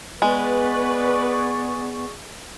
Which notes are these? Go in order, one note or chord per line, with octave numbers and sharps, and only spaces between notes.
G#3 B3 G#4 B4 D5 C#6